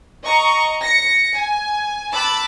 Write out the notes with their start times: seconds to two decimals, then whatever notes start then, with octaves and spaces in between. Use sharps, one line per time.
0.24 D#5 A#5 C#6
0.82 A#6 C#7
1.34 G#5
2.11 A5 B5 D6 E6 F#6